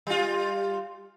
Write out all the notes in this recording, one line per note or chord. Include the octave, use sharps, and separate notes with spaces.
G3 F4